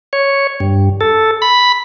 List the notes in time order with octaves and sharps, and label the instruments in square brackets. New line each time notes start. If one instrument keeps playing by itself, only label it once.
[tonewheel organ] C#5
G2
A4
B5